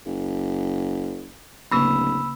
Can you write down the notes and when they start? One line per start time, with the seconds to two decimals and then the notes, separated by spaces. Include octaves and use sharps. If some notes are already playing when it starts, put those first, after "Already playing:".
0.06 F#1
1.71 D1 C#3 A#3 C#4 B5 E6